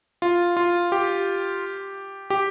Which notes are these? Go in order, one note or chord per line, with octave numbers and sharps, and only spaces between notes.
F4
F4
G4
G4